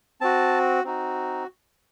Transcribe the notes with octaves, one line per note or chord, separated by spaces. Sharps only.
C4 F#4 A5
C4 D#4 F#4